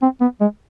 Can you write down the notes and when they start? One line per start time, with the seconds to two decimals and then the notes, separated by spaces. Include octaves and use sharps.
0.02 C4
0.21 B3
0.41 G#3